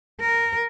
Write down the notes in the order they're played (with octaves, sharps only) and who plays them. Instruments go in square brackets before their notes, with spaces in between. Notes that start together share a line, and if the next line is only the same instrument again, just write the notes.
[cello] A#4